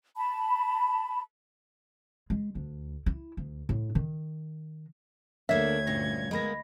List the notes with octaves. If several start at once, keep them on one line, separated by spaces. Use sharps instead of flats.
A5 B5
G#3
D2
E4
D2
A2
D#3
D2 D3 A#3 D4 C#5 E5 G#6
G2 A#2 C#4 A#6
G#3 A#3 B3 D#5 B5 A#6